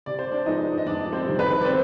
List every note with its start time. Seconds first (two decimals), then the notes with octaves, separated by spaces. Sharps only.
0.06 C3 D5
0.19 C5
0.31 D4 D5
0.46 F3 G#3 B3 D#4 D#5
0.78 D#5
0.86 F2 D4 D5
1.12 C4 C5
1.25 C3 D#3 G3
1.39 B3 B4
1.61 D5
1.65 C4 C5